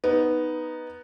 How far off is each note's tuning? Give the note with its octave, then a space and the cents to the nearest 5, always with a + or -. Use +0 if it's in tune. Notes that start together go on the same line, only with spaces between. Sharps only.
B3 +0 D#4 +0